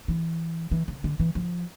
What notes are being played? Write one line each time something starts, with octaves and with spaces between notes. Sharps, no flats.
E3
E3
C#3
D3
E3
F3